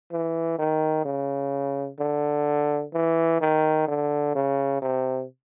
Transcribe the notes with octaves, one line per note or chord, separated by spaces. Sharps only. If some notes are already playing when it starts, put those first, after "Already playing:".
E3
D#3
C#3
D3
E3
D#3
D3
C#3
C3